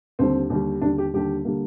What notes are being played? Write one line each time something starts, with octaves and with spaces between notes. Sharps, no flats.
D#2 D3 G3 C4
D#2 D3 G3
D#2 D3 G3 D4
G4
D#2 D3 G3 G4
D3 G3 A#3